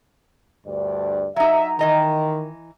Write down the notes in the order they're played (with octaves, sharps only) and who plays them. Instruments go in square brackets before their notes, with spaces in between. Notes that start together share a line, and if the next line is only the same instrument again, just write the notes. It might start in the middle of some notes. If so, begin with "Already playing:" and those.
[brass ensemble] D2 G2 D5
[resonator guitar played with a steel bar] F#3 D#4 [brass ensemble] E5
[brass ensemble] D#3 [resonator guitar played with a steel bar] E3 D#5 A#5